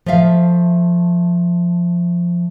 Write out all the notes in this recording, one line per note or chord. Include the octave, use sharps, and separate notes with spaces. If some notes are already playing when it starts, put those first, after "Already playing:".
F3 A3 E5 F5